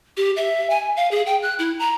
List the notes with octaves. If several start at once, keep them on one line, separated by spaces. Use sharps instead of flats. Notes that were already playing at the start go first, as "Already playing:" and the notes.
G4
E5
G#5
F5
G#4
G5
F#6
E4
A#5